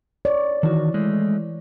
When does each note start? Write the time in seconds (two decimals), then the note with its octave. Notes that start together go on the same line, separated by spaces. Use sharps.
0.25 C#5 D5
0.63 D#3 E3 F#4
0.94 G#3 A3